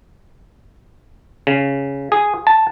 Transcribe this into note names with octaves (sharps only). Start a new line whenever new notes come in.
C#3
G#4
A5